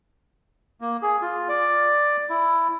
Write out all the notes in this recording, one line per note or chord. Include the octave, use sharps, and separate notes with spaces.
A#3
G#4
F4
D5
E4